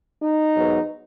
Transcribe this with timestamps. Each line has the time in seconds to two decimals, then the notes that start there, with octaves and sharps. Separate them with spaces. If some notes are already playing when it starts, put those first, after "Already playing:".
0.22 D#4
0.55 G#2 F#3 B3